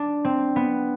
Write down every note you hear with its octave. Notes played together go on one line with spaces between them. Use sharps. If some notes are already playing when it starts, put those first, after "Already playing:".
Already playing: D4
C4
B3